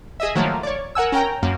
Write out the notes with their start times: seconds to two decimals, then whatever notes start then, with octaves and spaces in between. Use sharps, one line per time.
0.20 G#4 D#5 E5
0.35 D#3 F3 F#3 A3 A#3
0.63 C#5 D5
0.95 A#4 F#5 G#5 E6
1.12 C#4 A#4 G5 A#5
1.43 F#2 A#3